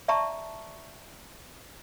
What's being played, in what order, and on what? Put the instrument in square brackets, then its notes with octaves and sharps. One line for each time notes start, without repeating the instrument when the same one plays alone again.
[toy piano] D5 E5 A5 A#5 C#6